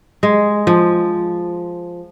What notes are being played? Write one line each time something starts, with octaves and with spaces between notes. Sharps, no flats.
G#3
F3